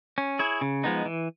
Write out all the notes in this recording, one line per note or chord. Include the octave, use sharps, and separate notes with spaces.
C#4
E4 G#4 C#5
C#3
F3 G#3 B3 D#4
E3